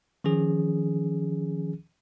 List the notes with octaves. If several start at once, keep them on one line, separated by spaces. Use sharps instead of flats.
D#3 F3 C#4 G#4